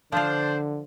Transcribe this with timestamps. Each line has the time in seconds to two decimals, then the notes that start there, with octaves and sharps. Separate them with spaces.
0.12 D3 F3 D4 F4 C5